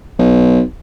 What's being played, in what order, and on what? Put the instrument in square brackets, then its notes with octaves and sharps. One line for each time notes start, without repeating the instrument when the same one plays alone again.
[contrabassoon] B1